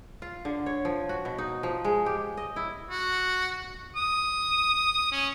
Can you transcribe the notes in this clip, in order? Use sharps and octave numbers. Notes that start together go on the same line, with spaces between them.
F4
D3
C#5
F3
F#4
B2
D#4
F3
G#3
G4
D#5
E4
F#4
D#6
C#4